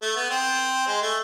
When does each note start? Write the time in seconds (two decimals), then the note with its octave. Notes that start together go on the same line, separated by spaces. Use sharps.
0.02 A3
0.16 B3
0.30 C4
0.87 G#3
1.02 A3